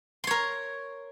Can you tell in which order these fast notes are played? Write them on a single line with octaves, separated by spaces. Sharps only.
C6 C#5 A#4